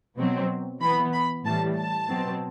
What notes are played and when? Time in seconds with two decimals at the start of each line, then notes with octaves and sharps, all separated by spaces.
0.17 B2 F#3 C4
0.81 E3 B3 B5
1.13 B5
1.44 A2 E3 G3 A5
1.77 A5
2.09 B2 F#3 C4